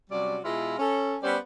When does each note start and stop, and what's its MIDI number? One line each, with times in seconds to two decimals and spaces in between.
0.10 0.39 48
0.10 0.39 54
0.10 0.39 55
0.10 0.39 61
0.10 0.39 74
0.45 0.75 47
0.45 0.75 56
0.45 0.75 64
0.45 0.75 65
0.79 1.16 61
0.79 1.16 69
1.22 1.37 55
1.22 1.37 59
1.22 1.37 61
1.22 1.37 67
1.22 1.37 72
1.22 1.37 74